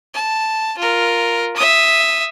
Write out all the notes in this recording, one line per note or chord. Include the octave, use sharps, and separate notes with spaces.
A5
F4 A#4
E5 D#6